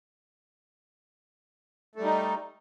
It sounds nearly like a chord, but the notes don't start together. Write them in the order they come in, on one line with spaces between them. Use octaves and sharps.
A3 G3 D#4